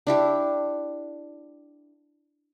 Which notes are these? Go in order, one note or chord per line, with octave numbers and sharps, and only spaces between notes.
D4 E4 G4 A4